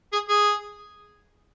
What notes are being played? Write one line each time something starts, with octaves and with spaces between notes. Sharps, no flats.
G#4
G#4